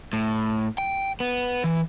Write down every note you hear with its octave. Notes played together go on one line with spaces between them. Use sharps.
A2
G5
B3
E3